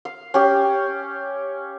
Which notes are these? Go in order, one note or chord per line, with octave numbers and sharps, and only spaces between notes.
F5
C#4 G4